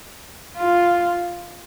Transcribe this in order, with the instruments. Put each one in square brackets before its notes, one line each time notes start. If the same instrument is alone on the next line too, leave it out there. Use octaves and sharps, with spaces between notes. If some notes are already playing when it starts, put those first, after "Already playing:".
[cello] F4